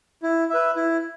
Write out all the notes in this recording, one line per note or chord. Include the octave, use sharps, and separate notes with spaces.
E4
B4 E5
E4